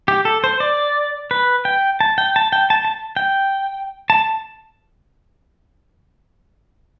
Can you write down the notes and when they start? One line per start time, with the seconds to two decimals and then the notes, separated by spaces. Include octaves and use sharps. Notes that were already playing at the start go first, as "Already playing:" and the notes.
0.08 G4
0.25 A4
0.44 C5
0.60 D5
1.31 B4
1.65 G5
2.01 A5
2.18 G5
2.36 A5
2.52 G5
2.70 A5
2.85 A5
3.17 G5
4.10 A5